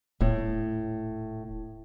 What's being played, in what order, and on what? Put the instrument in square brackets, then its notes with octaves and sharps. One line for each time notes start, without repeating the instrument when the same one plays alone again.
[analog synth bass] D#1 [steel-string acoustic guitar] A2